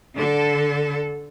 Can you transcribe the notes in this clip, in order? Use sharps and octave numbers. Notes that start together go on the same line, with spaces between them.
D3 A4